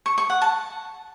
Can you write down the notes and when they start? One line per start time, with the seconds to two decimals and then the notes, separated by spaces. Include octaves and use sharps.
0.06 C#6
0.18 C#6
0.30 F#5
0.42 A5